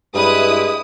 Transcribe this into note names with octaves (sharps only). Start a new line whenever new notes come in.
G2 G#3 E4 B4 D#6